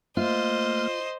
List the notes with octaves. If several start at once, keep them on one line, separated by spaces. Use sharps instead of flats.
A3 A#3 F4 C5 D#5 F6